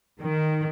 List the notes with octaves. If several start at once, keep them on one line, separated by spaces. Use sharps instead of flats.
D#3